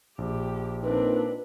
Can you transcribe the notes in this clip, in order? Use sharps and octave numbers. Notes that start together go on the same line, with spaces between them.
A#1 G4
A#2 C4 D4 D#4 B4